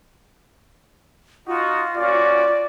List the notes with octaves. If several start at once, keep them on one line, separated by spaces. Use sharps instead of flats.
D#4 F4 F#4
A#3 C#4 F#4 D5